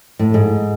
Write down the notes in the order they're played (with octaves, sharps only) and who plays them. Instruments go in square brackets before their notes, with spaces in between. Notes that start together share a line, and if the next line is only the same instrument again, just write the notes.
[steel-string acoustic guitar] A2
G#2